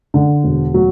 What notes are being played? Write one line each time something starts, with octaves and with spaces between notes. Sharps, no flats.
D3
E1
F#3